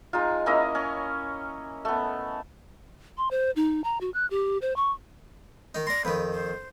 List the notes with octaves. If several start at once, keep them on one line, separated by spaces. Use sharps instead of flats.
G#3 D#4 F4
A#3 C#4 E4 D#5
C#4
A3 B3
C6
C5
D#4
A#5
F#4
F#6
G4
C5
C#6
D#3 D#4
D5 C6 A#6
F2 D#3 B4
C5